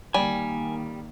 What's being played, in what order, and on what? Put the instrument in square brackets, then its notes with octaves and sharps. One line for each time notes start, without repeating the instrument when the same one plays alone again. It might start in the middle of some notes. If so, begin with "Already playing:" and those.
[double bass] D#3 A#3 [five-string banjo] G3 [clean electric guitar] G#5